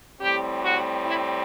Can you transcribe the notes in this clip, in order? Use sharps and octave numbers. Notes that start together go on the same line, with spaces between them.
A2 G3 C4 G4
F#4
E4